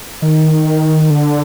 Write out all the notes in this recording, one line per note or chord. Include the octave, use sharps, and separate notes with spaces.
D#3
D3